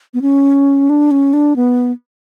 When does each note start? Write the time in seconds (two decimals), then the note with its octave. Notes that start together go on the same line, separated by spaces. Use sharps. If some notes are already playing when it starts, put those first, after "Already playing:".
0.14 B3
0.22 C#4
0.89 D4
1.11 C#4
1.33 D4
1.56 B3